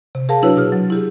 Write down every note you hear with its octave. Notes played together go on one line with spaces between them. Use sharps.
C3
G#4 A#4 F5 A5
F#3 D4 E4 F#4 B4 C#5
B2 G#4 F6
F#3
E4 G4 G#4